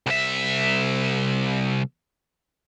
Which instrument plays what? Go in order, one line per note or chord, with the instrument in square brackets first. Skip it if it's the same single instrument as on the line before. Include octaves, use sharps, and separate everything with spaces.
[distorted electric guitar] C2 E5